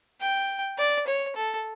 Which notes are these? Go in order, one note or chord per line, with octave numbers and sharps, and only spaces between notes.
G5
D5
C#5
A4